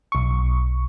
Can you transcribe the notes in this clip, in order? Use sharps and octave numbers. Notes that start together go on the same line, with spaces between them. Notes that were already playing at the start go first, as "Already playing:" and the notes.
B1 C#6